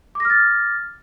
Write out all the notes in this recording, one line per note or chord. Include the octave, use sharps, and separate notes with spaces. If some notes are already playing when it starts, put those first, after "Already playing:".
D6 F6 A6 A#6